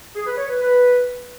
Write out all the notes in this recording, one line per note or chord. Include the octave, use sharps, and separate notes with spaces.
G#4
B4
C#5
B4
B4